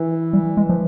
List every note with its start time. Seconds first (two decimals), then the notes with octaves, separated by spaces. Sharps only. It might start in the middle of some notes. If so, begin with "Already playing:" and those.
Already playing: E3
0.33 G3
0.57 G#3
0.69 F3